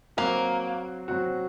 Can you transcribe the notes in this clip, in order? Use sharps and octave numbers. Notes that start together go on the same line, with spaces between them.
F#3 A#3 C4 F#4
F#3 C4 F#4